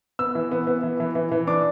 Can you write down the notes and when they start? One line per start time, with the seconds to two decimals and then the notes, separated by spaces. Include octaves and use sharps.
0.19 B3 E6
0.35 E3
0.51 B3
0.67 B3
0.83 E3
1.00 E3
1.15 E3
1.31 E3
1.47 D4 D6